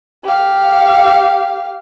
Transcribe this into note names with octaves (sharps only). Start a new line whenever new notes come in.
G4 F5